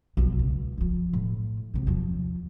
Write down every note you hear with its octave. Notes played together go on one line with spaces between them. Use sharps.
B1 F3
C#2
D#3 F3
A2
C3 D#3
D#2 F3